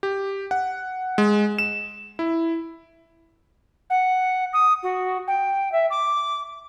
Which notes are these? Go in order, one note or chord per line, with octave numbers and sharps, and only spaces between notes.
G4
F#5
G#3
E7
E4
F#5
D#6
F#4
G5
E5
D6